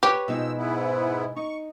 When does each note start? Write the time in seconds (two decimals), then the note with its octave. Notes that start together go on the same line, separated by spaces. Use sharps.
0.03 G4 B4 C#5
0.28 B2 F3 G#3 D#4 E6
0.57 G#2 B3 E4
1.36 D#4 C#6